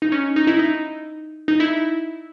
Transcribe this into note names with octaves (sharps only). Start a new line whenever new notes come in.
D#4
C#4
D#4
E4
D#4
D#4
E4